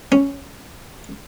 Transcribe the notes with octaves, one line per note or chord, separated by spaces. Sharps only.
C#4